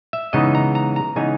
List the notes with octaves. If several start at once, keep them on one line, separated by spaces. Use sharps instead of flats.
E5
C#3 E3 G#3 B3 D#4 D#5
A#5
A#5
A#5
C#3 E3 G#3 B3 D#4 G#5